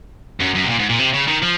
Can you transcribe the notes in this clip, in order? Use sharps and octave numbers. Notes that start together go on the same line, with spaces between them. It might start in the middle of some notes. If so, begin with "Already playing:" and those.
F#2
F#2
C3
A#2
G#2
A#2
C3
C#3
D#3
F3